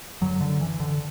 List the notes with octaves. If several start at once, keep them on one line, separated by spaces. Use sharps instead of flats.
F#2 D3 F#3
D3
E3
D3